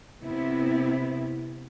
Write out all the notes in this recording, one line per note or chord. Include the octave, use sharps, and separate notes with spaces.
C3 B3 E4